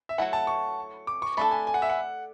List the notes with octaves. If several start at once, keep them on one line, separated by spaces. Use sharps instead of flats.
E5
F#3 A3 E4 F#5
A5
C#6
D6
C#6
A3 D4 A4 B5
G#5
G#5
F#5
E5
F#5